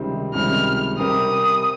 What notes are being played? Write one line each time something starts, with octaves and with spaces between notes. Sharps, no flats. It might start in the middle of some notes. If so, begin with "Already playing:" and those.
Already playing: C#2 C3 D#3 G3 C4
C#2 C3 D#3 G3 C4 F6
C3 G3 C4 G4 A#4 D#6